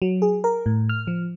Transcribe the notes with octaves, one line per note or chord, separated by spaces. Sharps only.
F#3
G#4
A#4
A2
F6
F3